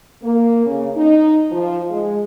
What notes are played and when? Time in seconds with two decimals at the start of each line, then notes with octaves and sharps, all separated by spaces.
0.23 A#3
0.66 C#3
0.96 D#4
1.52 F3
1.90 G#3